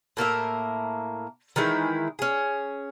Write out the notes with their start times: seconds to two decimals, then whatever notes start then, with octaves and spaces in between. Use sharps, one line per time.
0.17 A2 A#3 A#4 E5
1.56 D#3 E3 G#3 E4
2.19 C#4 G#4